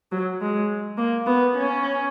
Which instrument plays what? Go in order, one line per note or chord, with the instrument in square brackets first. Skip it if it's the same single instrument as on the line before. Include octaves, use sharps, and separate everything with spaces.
[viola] F#3
G#3
A#3
B3
C#4